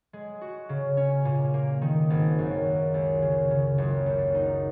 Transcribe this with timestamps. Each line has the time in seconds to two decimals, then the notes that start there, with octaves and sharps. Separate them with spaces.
0.13 G#3
0.41 F#4
0.69 C#3
0.97 C#4
1.25 A#2
1.54 A#3
1.82 D#3
2.10 G#1
2.39 F#2
2.66 A#3
2.94 C#2
3.22 C#3
3.51 C#3
3.78 F#1
4.06 F#2
4.35 D#4